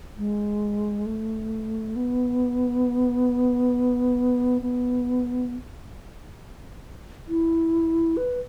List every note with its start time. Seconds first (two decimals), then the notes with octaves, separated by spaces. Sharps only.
0.18 G#3
1.06 A3
1.96 B3
4.62 B3
7.28 E4
8.17 B4